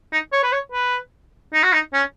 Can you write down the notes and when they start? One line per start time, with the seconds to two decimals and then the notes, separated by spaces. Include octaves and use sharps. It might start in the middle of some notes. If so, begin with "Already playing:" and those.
0.12 D#4
0.32 C#5
0.43 B4
0.53 C#5
0.72 B4
1.53 D#4
1.63 F#4
1.73 D#4
1.94 C#4